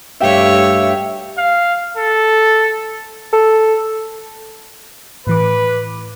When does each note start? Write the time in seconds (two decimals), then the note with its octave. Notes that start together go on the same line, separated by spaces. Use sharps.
0.20 G2 A3 G4 C#5 E5 F5 G5
1.38 F5
1.97 A4
3.33 A4
5.27 A2 E3 B4 D6